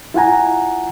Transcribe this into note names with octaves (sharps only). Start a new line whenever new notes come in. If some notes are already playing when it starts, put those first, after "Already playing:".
E4 F4 F#5 G#5 A#5